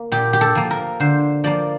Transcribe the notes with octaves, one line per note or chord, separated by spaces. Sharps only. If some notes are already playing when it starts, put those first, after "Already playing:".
Already playing: A#3
A#2 G4
G4
A4
F3 A#3
A#4
D3 C5
F3 A#3 D5